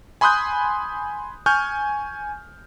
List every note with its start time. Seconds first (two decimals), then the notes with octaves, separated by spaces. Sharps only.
0.21 G#5 B5 C6 D#6 F#6 G6
1.46 G#5 C#6 F6 G6